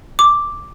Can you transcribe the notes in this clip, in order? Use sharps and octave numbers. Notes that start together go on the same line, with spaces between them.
D6